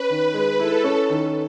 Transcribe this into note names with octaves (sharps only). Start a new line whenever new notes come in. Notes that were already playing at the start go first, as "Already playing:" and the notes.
Already playing: C#4 B4
D#3
G#3
E4 A4
C#4
D#3